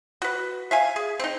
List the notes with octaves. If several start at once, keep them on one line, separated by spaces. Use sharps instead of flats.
F#4 B4
E5 F5 G#5
G#4
C4 D#4